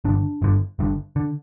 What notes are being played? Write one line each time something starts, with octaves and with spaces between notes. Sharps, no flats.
G1 G2 D3 D4
G1 G2 D3
G1 G2 D3
D3